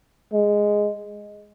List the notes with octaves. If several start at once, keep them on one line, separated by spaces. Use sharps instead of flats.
G#3